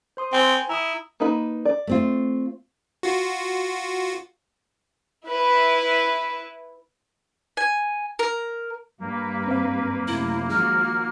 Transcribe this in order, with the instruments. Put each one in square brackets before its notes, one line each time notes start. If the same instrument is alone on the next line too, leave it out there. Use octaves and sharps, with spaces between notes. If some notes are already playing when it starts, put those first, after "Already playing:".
[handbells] C5 C6 D#6
[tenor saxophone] C4 [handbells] G5 G#5
[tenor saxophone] E4 [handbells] A#5 D#6
[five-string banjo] A#3 D#4 B4
D5
[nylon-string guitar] A3 C4 F4
[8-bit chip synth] F4 F#4
[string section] E4 B4
[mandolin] G#5
A#4
[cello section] G2 B4 [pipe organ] A#3
[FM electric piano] C4 F5
[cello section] F#2 C3 A3 [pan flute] E4
[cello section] D#3 F3 F#4 [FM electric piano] G#3 [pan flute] F6